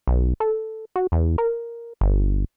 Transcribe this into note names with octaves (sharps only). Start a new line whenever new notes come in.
B1
A4
F#4
E2
A#4
G1